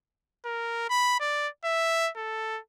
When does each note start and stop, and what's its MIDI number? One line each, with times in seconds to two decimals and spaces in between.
0.45 0.87 70
0.90 1.17 83
1.20 1.48 74
1.65 2.10 76
2.16 2.59 69